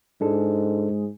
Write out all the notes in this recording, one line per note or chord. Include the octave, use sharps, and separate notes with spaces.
G#2 G#3 D4 E4 A4